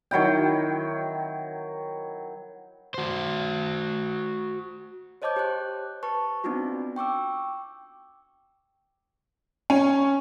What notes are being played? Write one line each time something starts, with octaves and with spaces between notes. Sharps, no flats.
D#3 F#3 E4 G5
F#4 C5
C5 C#5 D#5 A5 D6 G6
G4 C5 F#6
B4 A5 C#6
B3 C4 D4 D#4 F4 F#4
G5 C#6 D6 E6
C#4